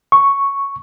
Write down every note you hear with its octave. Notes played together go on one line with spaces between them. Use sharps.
C#6